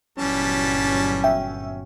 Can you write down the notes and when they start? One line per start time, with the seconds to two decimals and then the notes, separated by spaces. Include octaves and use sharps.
0.18 G1 A#2 E3 F#3 G3 C#4 A5
1.24 E5 G5